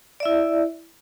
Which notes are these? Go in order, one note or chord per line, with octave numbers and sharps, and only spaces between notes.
E4 D5 E5